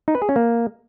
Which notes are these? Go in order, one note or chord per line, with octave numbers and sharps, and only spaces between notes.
D#4
B4
G#4
C#4
A#3